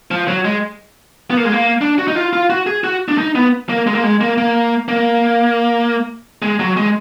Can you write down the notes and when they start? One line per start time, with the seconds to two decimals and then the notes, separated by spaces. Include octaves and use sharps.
0.11 F3
0.28 F#3
0.45 G#3
1.30 B3
1.37 A#3
1.45 G#3
1.52 A#3
1.81 D4
1.98 F#4
2.08 D#4
2.16 F4
2.33 F4
2.50 F#4
2.66 G#4
2.84 F#4
3.08 D4
3.18 D#4
3.35 B3
3.69 A#3
3.87 G#3
3.95 A#3
4.03 G#3
4.21 A#3
4.38 A#3
4.88 A#3
6.42 G#3
6.60 F#3
6.77 G#3